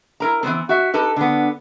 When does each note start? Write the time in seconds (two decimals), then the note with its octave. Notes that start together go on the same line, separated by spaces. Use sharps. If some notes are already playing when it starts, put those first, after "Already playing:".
0.20 E4 A#4 A#5
0.43 E3 F3 B3 C4
0.69 F#4 E5
0.94 D#4 G4 A4 B4
1.16 D3 B3